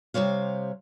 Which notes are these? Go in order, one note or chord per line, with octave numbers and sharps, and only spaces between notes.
C3 G3 C5 C#5 F5